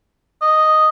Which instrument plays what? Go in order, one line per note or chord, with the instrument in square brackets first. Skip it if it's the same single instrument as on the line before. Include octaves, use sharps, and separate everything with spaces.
[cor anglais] D#5